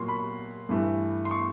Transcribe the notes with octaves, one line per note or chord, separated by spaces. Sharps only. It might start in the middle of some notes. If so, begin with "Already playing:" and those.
Already playing: A#2 F#3 A#3 C6 C#6
B5
G2 E3 A3
C6
C#6